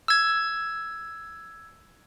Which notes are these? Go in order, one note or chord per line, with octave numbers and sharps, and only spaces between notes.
E6 G#6